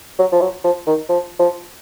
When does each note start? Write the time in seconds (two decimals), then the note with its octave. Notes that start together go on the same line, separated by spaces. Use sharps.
0.19 F#3
0.32 F3
0.41 F#3
0.64 F3
0.87 D#3
1.09 F3
1.39 F3